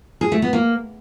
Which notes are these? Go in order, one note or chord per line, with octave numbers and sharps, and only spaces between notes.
G#4
A3
B3
A#3